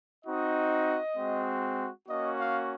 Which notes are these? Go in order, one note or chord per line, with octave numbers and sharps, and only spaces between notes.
C4 D#4 F#4 D#5
G#3 C4 F#4
A#3 C#4 F#4 D#5
F5